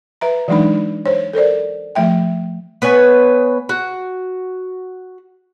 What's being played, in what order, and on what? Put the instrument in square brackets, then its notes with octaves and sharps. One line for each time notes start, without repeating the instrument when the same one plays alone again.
[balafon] B4 E5 A#5
E3 F#3 G#3 D4 D#4 B5
C5 C#5
A4 A#4 C5 D5
F3 A3 E5 G5
[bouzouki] B3 B4 C#5 G#5
F#4